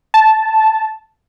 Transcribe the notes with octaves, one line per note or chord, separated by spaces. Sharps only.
A5